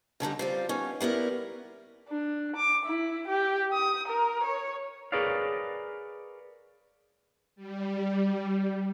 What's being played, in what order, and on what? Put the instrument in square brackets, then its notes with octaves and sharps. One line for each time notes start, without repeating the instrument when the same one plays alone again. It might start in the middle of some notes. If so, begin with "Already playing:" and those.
[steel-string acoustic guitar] F#2 D3 G3 D#4
G3 C4 F4
B3 C#4 D#4
G3 B3 E4 A#4
[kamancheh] D4
D6
E4
G4
D#6
A#4
C#5
[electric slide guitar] G#4 A#4 B4 C#5 D5 F5
[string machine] G3